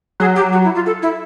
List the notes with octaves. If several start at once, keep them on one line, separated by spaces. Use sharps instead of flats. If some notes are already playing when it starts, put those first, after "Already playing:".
F#3 G#4
G4
F#4
E4
F4
A4
E4